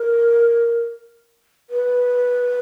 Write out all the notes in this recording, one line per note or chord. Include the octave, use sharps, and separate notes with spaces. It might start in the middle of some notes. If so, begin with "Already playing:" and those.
Already playing: A#4
B4